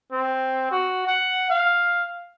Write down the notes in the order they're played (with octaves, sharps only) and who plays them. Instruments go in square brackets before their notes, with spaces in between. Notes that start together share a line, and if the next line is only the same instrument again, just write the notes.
[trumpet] C4
F#4
F#5
F5